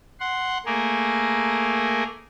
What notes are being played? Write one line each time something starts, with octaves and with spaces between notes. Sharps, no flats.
F#5 C6
A3 A#3 G#4 A#4